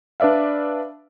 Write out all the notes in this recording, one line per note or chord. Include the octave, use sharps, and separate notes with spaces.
D4 B4 D5 E5 F5